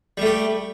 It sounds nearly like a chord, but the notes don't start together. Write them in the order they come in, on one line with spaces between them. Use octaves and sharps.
G3 A3 G4